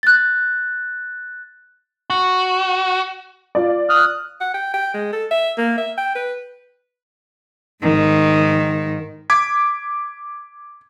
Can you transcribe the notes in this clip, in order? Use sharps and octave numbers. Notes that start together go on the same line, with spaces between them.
F#6 A6
F#4
F4 D5
D#6 F6 F#6
F#5
G5
G5
G#3
A4
E5
A#3
E5
G5
B4
G#2 D#3
D6 G#6 B6